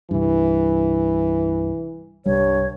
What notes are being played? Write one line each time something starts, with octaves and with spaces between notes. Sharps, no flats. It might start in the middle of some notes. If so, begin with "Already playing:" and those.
C2 G2 E3
C2 G2 G3 C#5